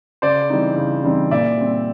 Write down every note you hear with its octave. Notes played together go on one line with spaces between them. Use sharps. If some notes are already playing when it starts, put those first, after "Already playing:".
C#3 C5 D5
E3 G3 C4 D#4
C#3
E3 G3 C4 D#4
A#2 D5 E5
G3 C4